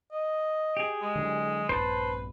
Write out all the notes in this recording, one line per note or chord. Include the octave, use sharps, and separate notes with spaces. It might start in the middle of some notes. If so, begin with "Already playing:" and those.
D#5
G4 G#4
G#3
D3 F#3
A#1 G2 B4 C5 A5